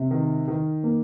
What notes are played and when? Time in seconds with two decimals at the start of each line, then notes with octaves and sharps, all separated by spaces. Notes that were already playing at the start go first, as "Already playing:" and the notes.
Already playing: C3
0.11 D#3
0.48 D#3
0.84 A#3